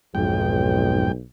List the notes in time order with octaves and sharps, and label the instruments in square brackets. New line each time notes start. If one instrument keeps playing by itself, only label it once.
[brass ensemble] B1 [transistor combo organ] F2 G#2 G5